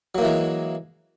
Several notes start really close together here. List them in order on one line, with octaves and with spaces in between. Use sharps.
F#3 A#3 E3 G#3